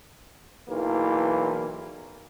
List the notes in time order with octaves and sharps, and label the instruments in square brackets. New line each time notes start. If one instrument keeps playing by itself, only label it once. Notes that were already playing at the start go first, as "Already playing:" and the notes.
[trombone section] B1 E2 E3 A#3